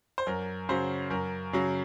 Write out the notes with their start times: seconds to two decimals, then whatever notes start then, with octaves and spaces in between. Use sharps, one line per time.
0.18 C5
0.27 F#2 A#4
0.69 C#3 F#3 C5
1.10 F#2 A#4
1.53 C#3 F#3